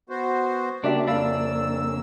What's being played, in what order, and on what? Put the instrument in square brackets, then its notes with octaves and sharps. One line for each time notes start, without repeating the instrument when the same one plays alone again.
[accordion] B3 F#4 C5
[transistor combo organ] C#3 A#3 [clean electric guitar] D4 [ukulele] F#4 G4 E5
[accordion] F2 E6 [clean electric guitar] D4 [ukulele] E5 F5 B5